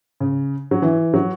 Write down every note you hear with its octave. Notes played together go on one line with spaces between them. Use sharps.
C#3
F#3
E3
F#3